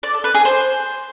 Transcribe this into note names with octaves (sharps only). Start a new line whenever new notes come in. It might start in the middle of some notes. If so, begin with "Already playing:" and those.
D5
A4
B4
G#4
C5